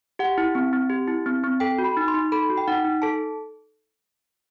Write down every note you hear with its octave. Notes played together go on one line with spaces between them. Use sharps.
G4 F#5
E4
C4
C4
G4
E4
C4
C4
A4 G5
F#4
B5
D#4
C6
D#4
A4 B5
F#4
G5
D#4 F#5
D#4
A4 A5